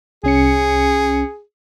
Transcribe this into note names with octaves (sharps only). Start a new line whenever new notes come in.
C2 C#4 G#4 C#7